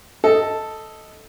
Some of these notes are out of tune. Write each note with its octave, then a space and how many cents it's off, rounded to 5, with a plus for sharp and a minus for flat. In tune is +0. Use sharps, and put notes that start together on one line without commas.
A4 +0 D#5 +10